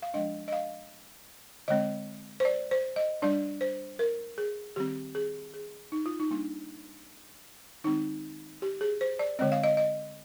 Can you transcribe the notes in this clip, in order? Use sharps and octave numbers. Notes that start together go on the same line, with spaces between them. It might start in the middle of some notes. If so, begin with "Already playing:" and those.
F5
F3 G#3 D4 D#5
D#5
F5
D3 G#3 C4 D#5
C5
D5
C5
D#5
G3 D4 D5
C5
A#4
G#4
D#3 G3 C4 G4
G#4
G#4
D#4
F4
D#4
G3 A#3 D4
D#3 G#3 C4 D#4
G4
G#4
C5
D5
D3 G#3 C4 D#5
F5
D#5
D#5